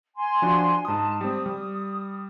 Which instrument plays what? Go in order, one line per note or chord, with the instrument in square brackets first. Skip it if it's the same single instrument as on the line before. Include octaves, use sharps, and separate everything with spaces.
[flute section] G#5 C6
[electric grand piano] F3 D4 F#4
[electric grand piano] G#2 D#6 [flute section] A5
[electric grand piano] G3 C4 [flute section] D#6
[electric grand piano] G3